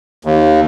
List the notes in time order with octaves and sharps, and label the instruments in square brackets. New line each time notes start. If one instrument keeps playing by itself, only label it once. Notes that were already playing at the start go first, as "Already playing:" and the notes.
[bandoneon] D#2